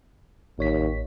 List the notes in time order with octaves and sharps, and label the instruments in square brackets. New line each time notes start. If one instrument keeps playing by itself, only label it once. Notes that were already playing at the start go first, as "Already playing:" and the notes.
[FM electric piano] A1 C#5 B6 [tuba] D#2